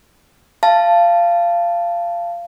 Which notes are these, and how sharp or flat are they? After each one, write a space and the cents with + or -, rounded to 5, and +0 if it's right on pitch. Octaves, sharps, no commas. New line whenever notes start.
F5 -20 A5 +0